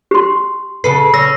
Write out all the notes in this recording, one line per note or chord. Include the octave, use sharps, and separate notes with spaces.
G4 C6
C#3 A4 B4 C7
C#4 E6 A#6